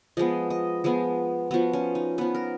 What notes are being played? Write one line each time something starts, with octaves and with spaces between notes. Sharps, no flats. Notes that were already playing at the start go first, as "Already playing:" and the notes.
F3 G#3 B3 D#5
D#5
F3 G#3 B3
F3 B3 F#4
C#4
D#4
F3 B3 B4
A#4